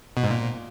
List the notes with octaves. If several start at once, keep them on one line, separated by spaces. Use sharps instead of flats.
B2
G#2
A#2